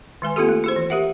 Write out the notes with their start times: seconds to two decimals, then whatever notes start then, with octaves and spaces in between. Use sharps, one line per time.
0.22 D#3 G#3 B4 G#5
0.36 A#3 C4 E4 F4 G4 A4
0.49 A3
0.64 E4 G#4 C5
0.76 E3
0.90 G4 A#4 E5 F#5